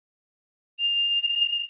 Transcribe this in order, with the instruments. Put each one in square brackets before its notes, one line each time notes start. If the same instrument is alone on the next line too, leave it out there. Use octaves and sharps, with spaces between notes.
[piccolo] F7